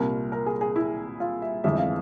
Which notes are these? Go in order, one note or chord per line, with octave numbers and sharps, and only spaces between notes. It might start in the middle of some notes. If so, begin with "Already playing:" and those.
Already playing: C2 A#2 G3 A#4
A#4
G#4
G#4
E4
F4
E5
G1 F2 E3 G#3 E5
F5